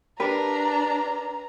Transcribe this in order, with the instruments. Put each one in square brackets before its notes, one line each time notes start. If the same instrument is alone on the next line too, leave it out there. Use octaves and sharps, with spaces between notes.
[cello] D4 [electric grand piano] G4 A#4 G5 [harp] B4 [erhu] A#5